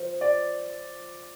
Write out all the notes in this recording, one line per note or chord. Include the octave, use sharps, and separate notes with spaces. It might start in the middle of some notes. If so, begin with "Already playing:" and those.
Already playing: F3
D5